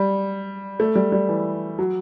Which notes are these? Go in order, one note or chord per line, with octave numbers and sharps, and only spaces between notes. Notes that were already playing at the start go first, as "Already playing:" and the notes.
Already playing: G3
A3
G3
G3
E3
F#3